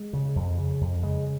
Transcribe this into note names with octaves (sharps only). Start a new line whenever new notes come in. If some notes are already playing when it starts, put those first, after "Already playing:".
Already playing: G#3
C#3
F2
C#3
F2
C#3 G#3